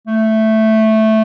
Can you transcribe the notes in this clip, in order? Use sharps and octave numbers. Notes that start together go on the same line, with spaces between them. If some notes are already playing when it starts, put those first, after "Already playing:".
A3